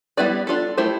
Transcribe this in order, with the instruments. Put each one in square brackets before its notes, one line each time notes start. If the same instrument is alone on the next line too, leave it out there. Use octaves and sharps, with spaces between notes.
[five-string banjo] G3 B3 E4 B4 D5
D4 F4 A4
A3 E4 G4 C5